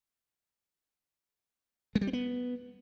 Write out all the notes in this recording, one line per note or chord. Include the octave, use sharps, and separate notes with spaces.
G#3
G3
C4
B3